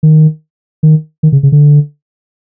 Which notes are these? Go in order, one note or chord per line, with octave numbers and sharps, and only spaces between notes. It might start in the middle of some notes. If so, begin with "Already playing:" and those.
D#3
D#3
D#3
C#3
C#3
D3